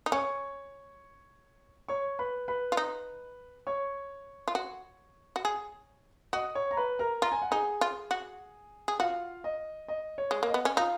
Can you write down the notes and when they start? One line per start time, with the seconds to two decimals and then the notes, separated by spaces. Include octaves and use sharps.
0.06 D#4
0.12 C#4 C#5 C#6
1.88 C#5 C#6
2.19 B4 B5
2.48 B4 B5
2.72 F4
2.77 D#4
3.67 C#5 C#6
4.48 F4
4.55 F#4
5.36 F#4
5.45 G#4
6.33 F#4 D#5 D#6
6.55 C#5 C#6
6.71 A#5
6.77 B4 B5
6.99 A#4 A#5
7.22 F4 A#5
7.32 G#5
7.42 F#5
7.51 D#4 G#4 G#5
7.81 F4
8.11 F#4
8.88 G#4
8.99 F4 F#4 F5
9.44 D#5
9.88 D#5
10.18 C#5
10.31 G#3
10.43 A#3
10.48 D#5
10.54 B3
10.65 C#4
10.77 D#4 F4 F5